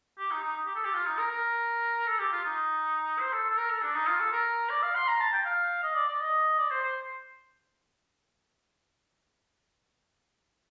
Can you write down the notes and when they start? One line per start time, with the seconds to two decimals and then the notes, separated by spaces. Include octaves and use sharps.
0.18 G4
0.31 D#4
0.44 D#4
0.66 G4
0.75 A4
0.85 G4
0.94 F4
1.06 D#4
1.19 A#4
1.32 A#4
2.07 A4
2.19 G4
2.32 F4
2.45 D#4
3.20 C5
3.32 A4
3.50 A4
3.57 A#4
3.70 A4
3.83 D4
3.95 D#4
4.07 F4
4.20 A4
4.33 A#4
4.70 D5
4.83 F5
4.96 C6
5.08 A#5
5.20 A5
5.33 G5
5.45 F5
5.83 D#5
5.95 D5
6.08 D5
6.21 D#5
6.58 D5
6.71 C5
6.83 C5